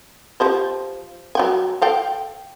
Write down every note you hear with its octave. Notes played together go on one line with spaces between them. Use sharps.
F3 G4 C5
F#3 G5 G#5
A4 F5 G5